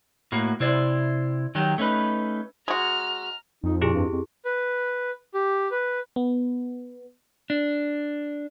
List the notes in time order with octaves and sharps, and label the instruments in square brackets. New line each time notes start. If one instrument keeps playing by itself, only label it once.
[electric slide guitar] A2 A#3 F#4
C3 E4 C5 D5
D#3 F#3 F#4 G4
A3 C#4 D#4 B4
[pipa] G#3 F#4 [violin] A#5 F6
[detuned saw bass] F2 [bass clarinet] D#4
[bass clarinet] A#2 [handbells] E4 G4 G#4
[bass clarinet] G2
F2
[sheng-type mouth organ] B4
G4
B4
[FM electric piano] B3
[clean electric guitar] D4